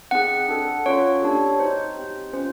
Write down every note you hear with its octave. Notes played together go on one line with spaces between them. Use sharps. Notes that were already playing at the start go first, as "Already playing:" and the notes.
C4 D#4 G#4 F#5
D4 F#4 A4
C#4 F4 A4 C#5
A#3 D4 G4
C4 D#4 F#4 C5
C4 D#4 G4
C#4 F4 C5